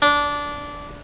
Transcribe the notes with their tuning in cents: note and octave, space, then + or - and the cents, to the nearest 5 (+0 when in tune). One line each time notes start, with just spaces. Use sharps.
D4 -15